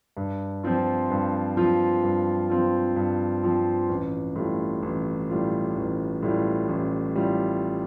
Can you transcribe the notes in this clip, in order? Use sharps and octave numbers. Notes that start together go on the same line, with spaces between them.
G2
F3 C4 F4
G2
F3 C4 F4
G2
F3 C4 F4
G2
F3 C4 F4
A1
A2 G3 F4
A1
A2 G3 F4
A1
A2 G3 F4
A1
A2 G3 F4